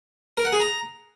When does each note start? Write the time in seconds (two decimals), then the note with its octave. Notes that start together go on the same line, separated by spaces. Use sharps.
0.37 A#4
0.45 F#5
0.52 G#4
0.60 A#5